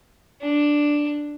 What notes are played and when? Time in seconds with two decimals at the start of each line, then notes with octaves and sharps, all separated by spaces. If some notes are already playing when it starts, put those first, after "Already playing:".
0.41 D4